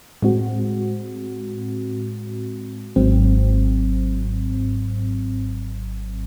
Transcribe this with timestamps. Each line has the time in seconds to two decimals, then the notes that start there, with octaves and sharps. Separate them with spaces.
0.22 A2 G#3 C4 F#4
2.96 G#1 G#2 F#3 C4